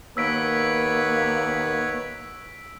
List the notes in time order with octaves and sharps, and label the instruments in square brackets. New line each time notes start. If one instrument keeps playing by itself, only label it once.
[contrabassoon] D#2 [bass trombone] A#3 [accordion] B3 B4 C#5 [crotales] E6 B6 D7